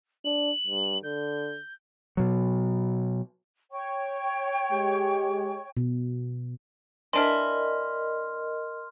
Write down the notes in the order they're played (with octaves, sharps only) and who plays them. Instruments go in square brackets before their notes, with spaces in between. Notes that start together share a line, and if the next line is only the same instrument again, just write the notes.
[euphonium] D4 [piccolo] F#7
[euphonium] G2
[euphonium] D3 [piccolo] G6
[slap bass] B2 F#3
[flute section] C#5 G5 C#6
[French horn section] G#3 G4
[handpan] B2
[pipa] E3 D4 E4 [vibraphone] A#4 D#5 [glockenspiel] C6 F6